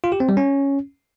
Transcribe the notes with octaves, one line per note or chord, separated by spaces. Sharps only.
F4
G4
C4
G3
C#4